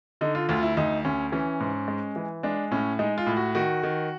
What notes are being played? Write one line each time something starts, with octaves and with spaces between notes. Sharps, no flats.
D3 D#4
F4
D2 F4
E4
D2 D#4
D2 C#4
E3 C#4
G#2
G#3
E3
G#3 D4
A2 C#4
G#3 D#4
F4
A2
F#4
D#3 F#4
D#3